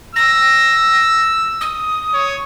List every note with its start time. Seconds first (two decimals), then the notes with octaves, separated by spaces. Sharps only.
0.15 E6 A#6
1.60 D#6
2.14 C#5